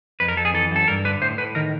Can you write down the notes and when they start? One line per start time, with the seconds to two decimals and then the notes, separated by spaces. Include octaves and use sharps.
0.20 F2 B4
0.28 A#4
0.37 F2 A4
0.45 G#4
0.54 E3 A4
0.71 F#2 A4
0.88 G2 A#4
1.05 D3 B4
1.22 A2 C5
1.38 A2 B4
1.55 D#3 A#4